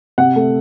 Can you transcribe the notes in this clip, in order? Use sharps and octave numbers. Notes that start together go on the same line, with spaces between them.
C3 F#5
A3